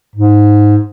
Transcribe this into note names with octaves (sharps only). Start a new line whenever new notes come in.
G#2